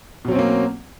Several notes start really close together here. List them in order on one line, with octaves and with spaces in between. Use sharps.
B2 F#3 C4 C#4 A#3